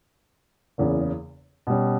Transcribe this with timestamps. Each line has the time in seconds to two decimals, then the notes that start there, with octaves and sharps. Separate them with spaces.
0.78 F#1 E2 C#3
1.67 B2 G3 C#4